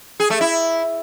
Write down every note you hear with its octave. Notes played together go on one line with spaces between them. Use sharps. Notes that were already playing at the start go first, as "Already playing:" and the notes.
G#4
A3
E4